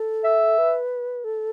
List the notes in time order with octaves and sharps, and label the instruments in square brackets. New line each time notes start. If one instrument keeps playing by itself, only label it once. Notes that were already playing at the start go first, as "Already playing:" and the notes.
Already playing: [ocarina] A4
[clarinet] E5
[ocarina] B4
A4